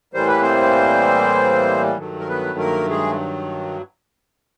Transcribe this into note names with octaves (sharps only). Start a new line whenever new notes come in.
A2 E3 G3 A#3 C5
B4
C4 C5
G2 D#3 F#3 A3
A#4
B3 B4
A#3 A#4
G#3 G#4